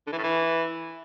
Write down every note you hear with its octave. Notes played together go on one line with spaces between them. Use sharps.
D3
E3
A2
E3